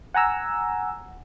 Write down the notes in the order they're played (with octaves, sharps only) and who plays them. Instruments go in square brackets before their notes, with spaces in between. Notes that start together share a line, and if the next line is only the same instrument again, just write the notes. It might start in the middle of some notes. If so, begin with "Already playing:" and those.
[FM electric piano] F#5 G#5 A#5 E6